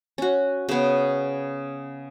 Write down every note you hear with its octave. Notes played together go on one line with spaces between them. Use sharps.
C#4 F#4
C#3 B3